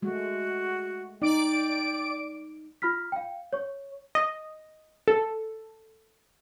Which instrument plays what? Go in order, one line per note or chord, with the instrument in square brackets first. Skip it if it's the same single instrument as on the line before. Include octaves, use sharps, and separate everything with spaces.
[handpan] G#3 A3 [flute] F#4
[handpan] D#4 [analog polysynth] D5 D6 D7 [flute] G5
[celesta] F4 B5 F6 B6
F5 G5
C#5 C#6
[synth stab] D#5
A4